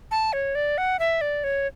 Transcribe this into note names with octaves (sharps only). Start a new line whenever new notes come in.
A5
C#5
D5
F#5
E5
D5
C#5